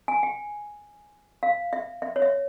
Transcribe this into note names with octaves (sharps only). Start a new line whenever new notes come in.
G#5
G5
F5
E5
E5
C#5
E5